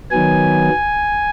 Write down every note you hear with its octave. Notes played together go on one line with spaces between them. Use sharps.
D#3 F#3 B3 G#5